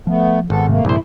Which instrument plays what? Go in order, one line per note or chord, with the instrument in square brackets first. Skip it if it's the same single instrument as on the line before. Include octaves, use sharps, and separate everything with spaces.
[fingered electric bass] F3 [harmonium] A3 B3
[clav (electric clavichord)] G#1 [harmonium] B3 A4
[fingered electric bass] G#2 C3 [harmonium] A3 A#3
[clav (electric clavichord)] A#1 C5 [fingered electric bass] G2 C3 [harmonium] E4